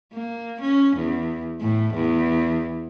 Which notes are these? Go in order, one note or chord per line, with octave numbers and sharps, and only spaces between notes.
A#3
C#4
E2
A2
E2